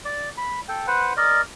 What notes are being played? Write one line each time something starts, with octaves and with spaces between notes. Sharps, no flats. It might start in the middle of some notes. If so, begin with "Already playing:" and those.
D5
B5
A4 G5
B4 C5 F#5
A#4 D5 D#5